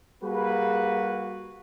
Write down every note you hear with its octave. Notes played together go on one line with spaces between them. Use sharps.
G3 A#3 F#4 G#4 B4